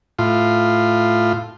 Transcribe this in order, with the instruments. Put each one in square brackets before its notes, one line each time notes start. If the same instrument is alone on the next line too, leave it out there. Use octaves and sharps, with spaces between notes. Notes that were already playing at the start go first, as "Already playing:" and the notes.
[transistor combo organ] A2 F4